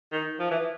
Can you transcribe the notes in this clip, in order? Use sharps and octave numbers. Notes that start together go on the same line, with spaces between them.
D#3
F3
E3